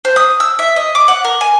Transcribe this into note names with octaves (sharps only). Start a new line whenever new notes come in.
C5
D#6
E6
E5
D#5
D6
F#5
A#4
G#5